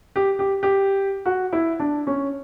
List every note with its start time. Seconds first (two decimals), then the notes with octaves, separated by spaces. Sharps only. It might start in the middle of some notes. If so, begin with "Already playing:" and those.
0.16 G4
0.39 G4
0.63 G4
1.26 F#4
1.53 E4
1.80 D4
2.07 C#4